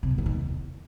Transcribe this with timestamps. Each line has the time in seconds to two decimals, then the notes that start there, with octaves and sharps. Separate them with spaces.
0.03 C3
0.11 A#2
0.18 D3
0.26 D#3
0.33 E2